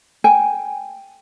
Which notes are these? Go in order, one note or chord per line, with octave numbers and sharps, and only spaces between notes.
G5 G#5